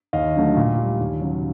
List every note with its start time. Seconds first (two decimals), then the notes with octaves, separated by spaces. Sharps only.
0.13 D#2 D#5 F5
0.35 D3 F#3 A3
0.57 A#2
0.78 G3
1.00 D#2
1.21 C#3 F#3